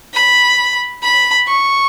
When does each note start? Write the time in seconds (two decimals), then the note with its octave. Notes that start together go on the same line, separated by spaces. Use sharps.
0.14 B5
1.03 B5
1.47 C#6